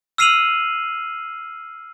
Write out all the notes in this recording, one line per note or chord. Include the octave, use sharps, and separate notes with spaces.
E6 F6 C7 D#7 F7 F#7